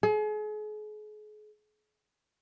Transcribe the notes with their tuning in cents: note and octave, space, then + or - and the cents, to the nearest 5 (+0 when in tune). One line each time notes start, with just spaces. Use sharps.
G#4 +40